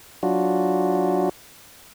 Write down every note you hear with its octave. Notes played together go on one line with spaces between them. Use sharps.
F#3 D4 F4 F#4